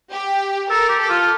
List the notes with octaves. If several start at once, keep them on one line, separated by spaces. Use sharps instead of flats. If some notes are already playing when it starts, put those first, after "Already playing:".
G4
A4 A#4
G4
A4
F4